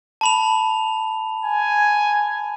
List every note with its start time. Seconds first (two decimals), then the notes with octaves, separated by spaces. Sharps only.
0.21 A5 B5 F7
1.45 G#5